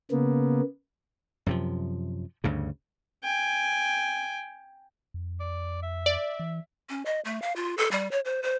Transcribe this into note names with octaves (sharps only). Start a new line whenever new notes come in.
C#3 A#3 B3
F#2 C3 F3
D2 G2 C#3
G5 G#5
F2
D5
E5
D5
E3
C#4
D#5
A3
F5
F4
A4
G3
C#5
C5
C5